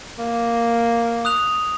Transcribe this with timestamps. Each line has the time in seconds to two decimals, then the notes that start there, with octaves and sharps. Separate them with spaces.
0.19 A#3
1.25 D#6 F#6 F7